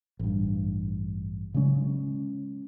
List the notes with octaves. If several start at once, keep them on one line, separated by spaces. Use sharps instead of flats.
A1 G2
C#3 F#3 G#3 C#4